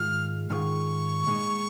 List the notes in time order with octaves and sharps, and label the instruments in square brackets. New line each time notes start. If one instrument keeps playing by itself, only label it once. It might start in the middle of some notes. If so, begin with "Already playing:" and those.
Already playing: [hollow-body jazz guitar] G#2 D#3 G#3 F4 [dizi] F6
[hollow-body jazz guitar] G#2 D#3 G#3 F4 [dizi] C#6 F6
[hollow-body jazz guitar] A#2 G#3 D#4